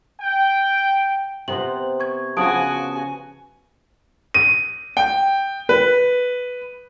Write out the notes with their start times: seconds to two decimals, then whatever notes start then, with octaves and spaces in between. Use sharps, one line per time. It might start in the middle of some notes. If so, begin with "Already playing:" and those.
0.21 G5
1.48 C3 B3 C4 F#7
2.00 C#6 G#6
2.37 C#3 F3 B3 F#4 G#5 A5 D#6 D7
4.34 D#7
4.97 G5
5.69 B4